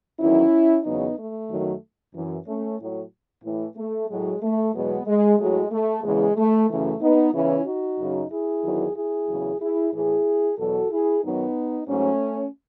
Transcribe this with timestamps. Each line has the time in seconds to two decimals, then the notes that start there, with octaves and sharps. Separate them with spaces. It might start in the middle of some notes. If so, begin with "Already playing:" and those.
0.20 E2 D#3 F#3 C#4 E4
0.84 E2 C#3 F#3 B3 D#4
1.17 A3
1.50 F#2 D#3 F#3
2.14 F#2 E3
2.47 A3 C#4
2.79 A2 F#3
3.44 A2 E3
3.76 A3
4.09 A2 F#3 G#3
4.42 A3
4.74 E2 B2 F#3 G#3 B3
5.06 G#3
5.39 A2 F#3 G#3
5.71 A3
6.04 E2 C#3 E3 G#3
6.36 A3
6.69 F#2 C#3 E3 A3
7.01 B3 D#4
7.33 E2 C#3 E3 C#4 E4
7.66 D#4 F#4
7.99 F#2 C#3 F#3
8.31 E4 G#4
8.63 E2 D#3 F#3
8.96 E4 G#4
9.28 E2 C#3 F#3
9.61 E4 G#4
9.93 A2 E3 E4 G#4
10.58 E2 B2 F#3 F#4 A4
10.90 E4 G#4
11.23 F#2 D#3 F#3 B3 D#4
11.87 G#2 F#3 A3 C#4